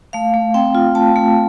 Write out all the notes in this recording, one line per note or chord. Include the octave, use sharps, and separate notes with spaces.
A3 F5
A3
C4 G5
F4
A3 A5
A3